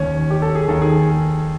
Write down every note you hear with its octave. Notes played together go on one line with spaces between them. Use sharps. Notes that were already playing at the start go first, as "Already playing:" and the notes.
Already playing: D#2 D#3 C#4
G4
A4
G#4
D#2 D#3 A4
G#4